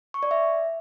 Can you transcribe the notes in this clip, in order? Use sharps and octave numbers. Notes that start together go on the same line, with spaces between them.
C#6
D5
E5